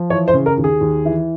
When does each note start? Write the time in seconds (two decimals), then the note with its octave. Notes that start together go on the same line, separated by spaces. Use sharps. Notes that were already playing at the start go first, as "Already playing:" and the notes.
Already playing: F3
0.10 E3 C#5
0.28 C5
0.34 C#3
0.46 A#4
0.58 D#2
0.64 G#4
0.81 D#2
1.05 E3